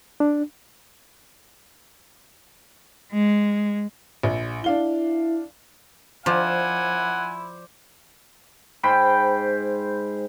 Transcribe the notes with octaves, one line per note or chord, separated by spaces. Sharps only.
D4
G#3
A#1
D4 E4 F5 G7
F3 E4 C5 D5 F#5 G#5
G#2 C5 G5 B5